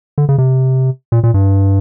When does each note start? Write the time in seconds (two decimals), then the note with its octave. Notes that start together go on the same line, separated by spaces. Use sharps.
0.18 D3
0.29 C#3
0.38 C3
1.12 A#2
1.24 A#2
1.34 G2